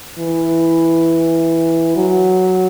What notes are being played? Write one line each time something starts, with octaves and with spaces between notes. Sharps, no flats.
E3
F#3